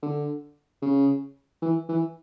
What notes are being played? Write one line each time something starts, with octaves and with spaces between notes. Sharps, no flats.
D3
C#3
E3
E3